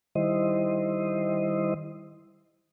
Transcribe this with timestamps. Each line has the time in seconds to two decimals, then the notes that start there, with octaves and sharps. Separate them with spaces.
0.15 D#3 G3 E4 C5 D#5